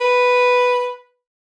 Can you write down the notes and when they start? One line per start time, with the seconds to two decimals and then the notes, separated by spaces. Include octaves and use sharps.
0.01 B4